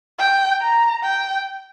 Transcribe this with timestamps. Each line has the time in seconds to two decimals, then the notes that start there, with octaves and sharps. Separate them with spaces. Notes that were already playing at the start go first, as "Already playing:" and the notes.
0.19 G5
0.61 A#5
1.03 G5